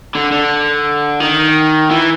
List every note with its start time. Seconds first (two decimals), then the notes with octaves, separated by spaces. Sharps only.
0.15 D3
0.32 D3
1.20 D#3
1.90 E3